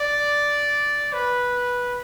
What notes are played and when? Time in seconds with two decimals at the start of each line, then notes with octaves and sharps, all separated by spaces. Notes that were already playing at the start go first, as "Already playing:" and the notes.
Already playing: D5
1.13 B4